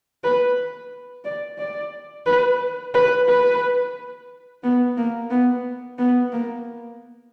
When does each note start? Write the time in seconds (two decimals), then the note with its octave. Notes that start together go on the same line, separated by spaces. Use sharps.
0.24 B4
1.25 D5
1.59 D5
2.26 B4
2.94 B4
3.28 B4
4.64 B3
4.97 A#3
5.31 B3
5.99 B3
6.33 A#3